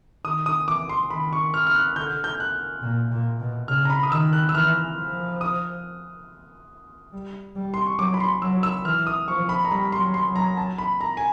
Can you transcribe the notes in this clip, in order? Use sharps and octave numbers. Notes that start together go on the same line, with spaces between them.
D#3 D#6
D#6
E3 D6
C6
D#3 B5
C#6
F6
F6
F#6
D3 G6
G6
F#6
A#2
A#2
B2
C#3 F6
A#5
B5
D#6
D#3 E6
F#6
E6
E3 F6
F3
D#6
G3
G3
C6
C#6
F#3 D6
B5
C6
F#3 E6
E6
E3 F6
D#6
F3 C#6
B5
A#5
G3 B5
C6
F#3
C6
F#3
A#5
A5
B5
A#5
G#5